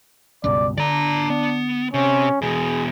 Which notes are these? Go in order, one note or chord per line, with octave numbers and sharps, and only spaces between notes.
C#2 G2 B2 D5
D3 D4 D5 A#5
B3
C3 C#4
E2 B2 G#4